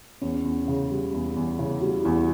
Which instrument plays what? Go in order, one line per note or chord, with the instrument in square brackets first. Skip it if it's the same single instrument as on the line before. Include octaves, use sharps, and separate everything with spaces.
[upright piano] E2 [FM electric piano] C#4
[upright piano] E2
C#3
G3
E2
E2
[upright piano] C#3 [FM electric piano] E4
[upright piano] G3 [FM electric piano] F#4
[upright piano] E2 [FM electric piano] E4